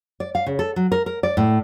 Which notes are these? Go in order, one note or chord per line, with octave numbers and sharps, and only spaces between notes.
D5
F5
C#3
A4
F#3
A#4
A#4
D5
A2